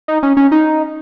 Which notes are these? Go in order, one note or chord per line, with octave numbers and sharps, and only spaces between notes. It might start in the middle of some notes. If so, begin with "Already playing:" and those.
D#4
C#4
C#4
D#4